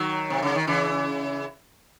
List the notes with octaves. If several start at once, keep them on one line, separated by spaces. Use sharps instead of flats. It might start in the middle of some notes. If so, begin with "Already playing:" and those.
Already playing: D#3 F#3
C3
C#3
D#3
C#3 E3